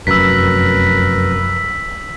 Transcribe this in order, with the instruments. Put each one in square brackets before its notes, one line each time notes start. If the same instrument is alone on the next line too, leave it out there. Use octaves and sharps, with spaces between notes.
[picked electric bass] F1 F#2 [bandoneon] A#4 B4 [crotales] E6 B6